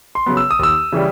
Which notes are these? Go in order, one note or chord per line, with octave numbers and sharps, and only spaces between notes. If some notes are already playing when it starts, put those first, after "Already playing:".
C6
C#3 F#3 B3
E6
D#6
D#2 E6
C#3 E3 G3